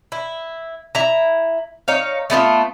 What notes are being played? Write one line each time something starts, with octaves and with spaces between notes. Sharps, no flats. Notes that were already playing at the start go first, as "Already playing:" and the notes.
E4
E4 A#5
D#4 C#5 F5
A3 B3 E4 F4